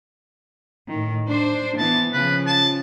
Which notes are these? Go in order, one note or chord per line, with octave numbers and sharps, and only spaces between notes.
A2 D#3
D4 C5
E3 B3 A5
C#3 F3 B4
A5